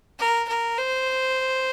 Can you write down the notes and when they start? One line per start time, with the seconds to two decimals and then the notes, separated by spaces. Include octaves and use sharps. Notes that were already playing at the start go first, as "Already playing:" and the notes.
0.19 A#4
0.48 A#4
0.78 C5